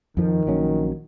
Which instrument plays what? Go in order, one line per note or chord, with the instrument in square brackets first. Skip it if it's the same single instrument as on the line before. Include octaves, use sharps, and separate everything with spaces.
[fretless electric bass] F2 F3 [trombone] D#3
[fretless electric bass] A#1 F#3 C#4